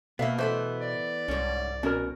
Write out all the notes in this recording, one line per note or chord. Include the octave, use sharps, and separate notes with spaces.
B2 A#3 B3 E5 F5
E3 A3 B3 C5
D5
C2 G#2 C#4
B2 C#4 A#4